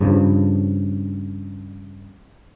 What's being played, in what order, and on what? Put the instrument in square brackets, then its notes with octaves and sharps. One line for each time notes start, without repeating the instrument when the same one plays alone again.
[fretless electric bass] G2 C#3 F3